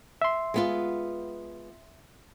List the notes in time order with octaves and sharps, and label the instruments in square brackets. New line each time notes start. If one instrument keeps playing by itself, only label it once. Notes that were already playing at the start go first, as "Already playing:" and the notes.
[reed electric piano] E5 C6
[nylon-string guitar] G#3 B3 F4